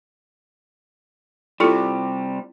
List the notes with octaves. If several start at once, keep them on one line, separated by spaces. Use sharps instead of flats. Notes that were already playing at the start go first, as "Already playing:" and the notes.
C3 G3 E4 F4 A4